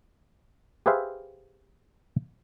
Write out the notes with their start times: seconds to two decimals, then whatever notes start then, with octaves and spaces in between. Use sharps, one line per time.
0.86 G4 G#4 B4 C5 E5 F5